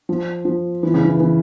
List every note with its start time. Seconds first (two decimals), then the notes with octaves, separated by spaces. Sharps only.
0.09 F3
0.45 F3
0.83 E3
0.94 C#3
1.05 E3
1.20 E3